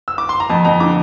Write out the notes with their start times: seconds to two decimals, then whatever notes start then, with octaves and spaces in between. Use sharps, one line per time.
0.08 E6
0.18 D6
0.29 C6
0.40 A#5
0.49 F2 A5
0.65 F2 A#5
0.80 D3 D6